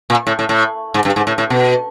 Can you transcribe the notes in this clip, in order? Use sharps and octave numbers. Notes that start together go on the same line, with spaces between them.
A#2
A2
A2
A2
G#2
G2
G#2
A2
A2
B2